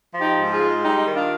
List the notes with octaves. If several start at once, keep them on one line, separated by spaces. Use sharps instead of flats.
F3
D#4 G4
G#2
F4 G#4
G#3
G3 D#4 G4
D#3
D4 F4